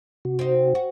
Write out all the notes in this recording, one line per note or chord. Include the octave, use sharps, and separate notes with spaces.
C3 F#4
C4 D#4
F#4